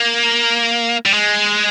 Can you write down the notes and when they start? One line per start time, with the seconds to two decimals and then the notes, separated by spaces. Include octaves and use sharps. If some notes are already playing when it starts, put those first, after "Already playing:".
Already playing: A#3
1.06 G3
1.13 G#3